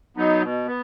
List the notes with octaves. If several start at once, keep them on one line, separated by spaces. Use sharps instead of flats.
F#3 B3 D#4
B2
B3